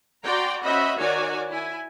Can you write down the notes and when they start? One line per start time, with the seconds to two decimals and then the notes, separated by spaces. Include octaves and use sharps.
0.25 F#4 D5 G5 A#5 C6
0.63 C#4 F#4 C5 D#5 E5 B5
0.97 D#3 F#4 A#4 C#5 D5 G#5
1.49 E4 G#5